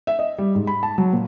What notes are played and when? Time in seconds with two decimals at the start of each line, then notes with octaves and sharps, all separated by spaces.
0.07 E5
0.19 D#5
0.38 G3
0.55 G#2
0.67 B5
0.83 A5
0.98 F#3
1.13 A#2